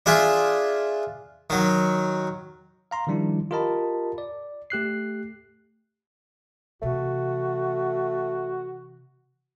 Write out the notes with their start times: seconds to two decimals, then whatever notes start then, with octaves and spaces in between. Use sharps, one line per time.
0.06 D4 F4 G#4 E5
1.50 D#3 F#3
2.91 F5 A#5 C6
3.07 D#3 F3 G3 D4 E4
3.51 F4 G4 A#4 D#5 A5 B5
4.18 D5
4.70 A3 G4 F#6 C7
6.82 C3 E3 A3 F#4